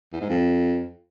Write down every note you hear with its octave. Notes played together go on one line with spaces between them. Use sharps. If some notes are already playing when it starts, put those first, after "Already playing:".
E2
G#2
F2